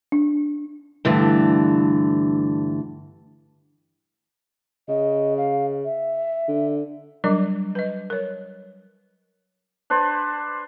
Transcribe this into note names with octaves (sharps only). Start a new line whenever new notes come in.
D4
G2 D3 E3 A3
C#3 D#5
F5
E5
D3
F#3 G3 D4 A#4 D#5
B4 D#5
A#4 C#5
D4 B4 C5 D5